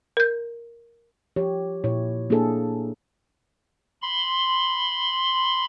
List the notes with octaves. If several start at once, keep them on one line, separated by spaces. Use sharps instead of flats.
A#4 G6
F3 G4 C#5
A#2 E4 C#5
A#3 D4 E4 G#4 A4
B5 C6